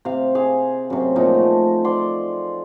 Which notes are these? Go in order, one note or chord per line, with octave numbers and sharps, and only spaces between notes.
C3 F5
G#4 F5
F#2 C3
A#2 F3 D#4
A3
D5 C6